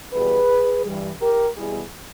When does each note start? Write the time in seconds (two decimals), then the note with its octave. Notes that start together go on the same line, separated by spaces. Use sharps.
0.13 E2 B2 G3 G#4 B4
0.85 G2 E3 G3
1.21 G4 A#4
1.57 E2 B2 G3 E4 G#4